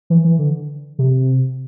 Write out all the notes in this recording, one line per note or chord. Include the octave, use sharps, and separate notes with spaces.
E3
E3
D3
C3